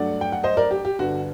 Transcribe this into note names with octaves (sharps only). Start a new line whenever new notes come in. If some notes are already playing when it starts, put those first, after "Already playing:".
Already playing: G2 F#3 A3 D4 D5 F#5
G5
F#5
C5 D#5
A#4 D5
G4
G4
G1 G2 D3 F#4